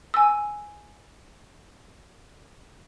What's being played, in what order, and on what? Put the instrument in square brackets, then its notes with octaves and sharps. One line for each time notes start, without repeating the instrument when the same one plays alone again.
[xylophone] G#5 E6